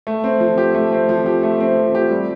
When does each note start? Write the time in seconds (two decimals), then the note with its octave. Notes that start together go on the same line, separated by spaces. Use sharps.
0.07 A3
0.24 C4
0.40 F3
0.58 G4
0.75 A3
0.92 C4
1.09 F3
1.26 G4
1.43 A3
1.60 C4
1.77 F3
1.95 G4
2.11 G3